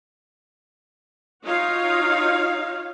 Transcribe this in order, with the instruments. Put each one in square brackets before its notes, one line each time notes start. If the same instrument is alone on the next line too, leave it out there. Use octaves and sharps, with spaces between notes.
[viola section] D#4 F4 F#4 C#5 F5